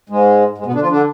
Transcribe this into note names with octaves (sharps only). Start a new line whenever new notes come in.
G#2 G#3
G#2 G#3
B2 B3
D3 D4
F3 F4
D3 D4